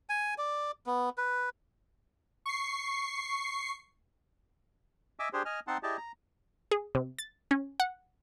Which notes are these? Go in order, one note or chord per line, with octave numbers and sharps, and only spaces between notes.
G#5
D5
B3
B4
C#6 C7
D#5 E5 G#5 D6 E6
D4 G4 G#4 C5
D#5 G#5 F6
C4 D#4 F#5 A5 C6
E4 G4 G#4 D5 D#5 A5
A#5
G#4
C3
A6
C#4
F#5